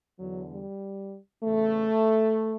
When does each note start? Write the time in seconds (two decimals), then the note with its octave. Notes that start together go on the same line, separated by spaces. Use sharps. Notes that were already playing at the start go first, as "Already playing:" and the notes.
0.18 E2 D3 F#3
0.50 G3
1.44 E2 C#3 E3 A3